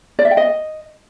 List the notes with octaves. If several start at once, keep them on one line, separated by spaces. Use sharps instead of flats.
D5
E5
G5
D#5